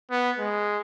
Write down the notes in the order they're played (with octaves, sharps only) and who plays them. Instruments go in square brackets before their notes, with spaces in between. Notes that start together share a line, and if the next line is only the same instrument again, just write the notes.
[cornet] B3
G#3